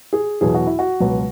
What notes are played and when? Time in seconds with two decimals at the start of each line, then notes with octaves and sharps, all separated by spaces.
0.13 G#4
0.41 E2 B2 F#3 G#4
0.54 F#4
0.67 E4
0.79 F#4
1.00 C#2 B2 F#3